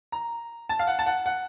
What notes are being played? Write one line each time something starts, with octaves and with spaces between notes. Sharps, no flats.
A#5
A5
F5
F#5
A5
F#5
F#5